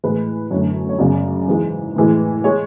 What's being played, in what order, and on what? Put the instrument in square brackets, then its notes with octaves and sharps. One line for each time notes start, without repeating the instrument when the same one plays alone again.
[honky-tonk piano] A2 E3 G#3 B4
F#2 D3 A3 C#5
C#5
F#2 C#3 G#3 D5
G#2 E3 G#3
A2 E3 G#3
G#3 C#5